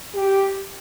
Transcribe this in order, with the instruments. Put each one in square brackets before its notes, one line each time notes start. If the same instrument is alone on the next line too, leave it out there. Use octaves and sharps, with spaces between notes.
[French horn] G4